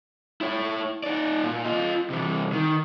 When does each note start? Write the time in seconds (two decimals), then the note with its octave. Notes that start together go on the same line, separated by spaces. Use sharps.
0.41 E4 C#5
1.04 D#4 D5
1.44 A#2
1.65 F4 D#5
2.10 C3 E3
2.52 D#3